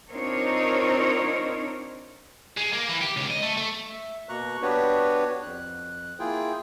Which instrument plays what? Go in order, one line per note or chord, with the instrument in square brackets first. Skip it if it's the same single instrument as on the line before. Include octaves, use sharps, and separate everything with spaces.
[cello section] C4 D4 D#4 F4 A#4 C#5
[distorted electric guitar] G#3
A#3
E3
G4
C#2
D#5
A3
A3
[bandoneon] E5
B2 A#3 A#5 C#6 F#6
B3 D4 F#4 G4 B4 C#5
F2 F#6
A#3 E4 F4 G#4 G5